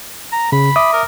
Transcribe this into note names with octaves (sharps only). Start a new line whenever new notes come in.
A#5
C#3 B5
E5 D6 D#6
A#4